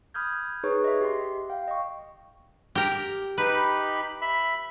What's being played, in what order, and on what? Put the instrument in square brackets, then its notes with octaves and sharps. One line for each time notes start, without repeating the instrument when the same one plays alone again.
[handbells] B5 D#6 F6 G6 G#6
D#4 G#4 B4 C#5 C#6
D#5 E5
G4 C6
F5 G5
D#5 C#6
[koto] G4 A#4
[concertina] D#4 G4 B5 [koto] B4
[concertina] E5 B5